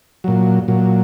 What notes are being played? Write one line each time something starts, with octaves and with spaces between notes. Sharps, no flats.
A#2 F#3
A#2 F#3